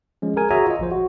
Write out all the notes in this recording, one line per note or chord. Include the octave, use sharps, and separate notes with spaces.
F3 G#3 C#4
G#4 A#4 G#5
F#4 G#4 C#5 E5 G#5 A#5
F4 D#5
A#1 F3 C5
F#4